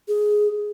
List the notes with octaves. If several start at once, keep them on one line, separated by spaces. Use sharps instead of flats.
G#4